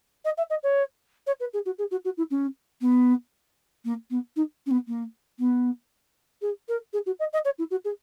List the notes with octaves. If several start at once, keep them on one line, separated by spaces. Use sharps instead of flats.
D#5
E5
D#5
C#5
C#5
B4
G#4
F#4
G#4
F#4
F#4
E4
C#4
B3
A#3
B3
D#4
C#4
B3
A#3
B3
G#4
A#4
G#4
F#4
D#5
D#5
C#5
E4
F#4
G#4